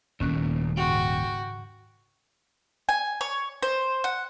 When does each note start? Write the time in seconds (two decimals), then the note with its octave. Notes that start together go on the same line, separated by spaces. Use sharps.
0.20 D#1 C2 A#2 D#3 C#4 F#6
0.78 G#2 C#3 F#4 G5
2.89 G#5
3.21 C#5
3.63 C5
4.04 F#5